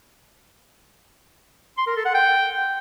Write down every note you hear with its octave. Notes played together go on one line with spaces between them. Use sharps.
C6
A#4
A4
F#5
G5